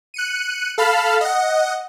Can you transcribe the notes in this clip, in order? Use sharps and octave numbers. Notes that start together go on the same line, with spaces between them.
F#6 C#7 D#7
A4 F5 A5 B5 F6
D#5 F#5